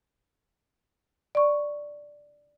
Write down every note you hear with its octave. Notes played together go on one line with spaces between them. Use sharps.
D5 C#6